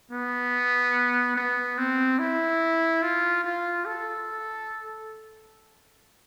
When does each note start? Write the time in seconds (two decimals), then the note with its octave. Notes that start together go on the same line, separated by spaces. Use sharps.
0.11 B3
1.36 B3
1.78 C4
2.19 E4
3.03 F4
3.44 F4
3.86 A4